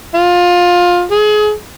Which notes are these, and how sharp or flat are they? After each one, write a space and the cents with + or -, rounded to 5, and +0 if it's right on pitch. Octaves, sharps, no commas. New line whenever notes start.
F4 +20
G#4 +30